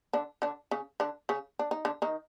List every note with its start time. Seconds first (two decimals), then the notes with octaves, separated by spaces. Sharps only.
0.13 D3 D4
0.42 D3 D4
0.71 C#3 C#4
1.00 D3 D4
1.29 C#3 C#4
1.59 D4
1.71 D#4
1.85 D3 D4
2.02 D#3 D#4